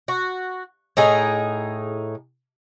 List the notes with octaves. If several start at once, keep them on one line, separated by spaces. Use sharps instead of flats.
F#4
A2 D#4 G#4